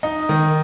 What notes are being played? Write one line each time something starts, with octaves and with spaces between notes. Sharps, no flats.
D#4
D#3